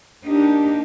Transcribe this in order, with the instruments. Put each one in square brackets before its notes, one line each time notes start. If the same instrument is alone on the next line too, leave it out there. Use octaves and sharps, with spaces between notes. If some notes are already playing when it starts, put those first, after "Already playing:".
[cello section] A#3 D#4 G4 [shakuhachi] D4